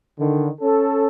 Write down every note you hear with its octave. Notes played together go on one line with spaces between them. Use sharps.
D3 D#3
C#4 A4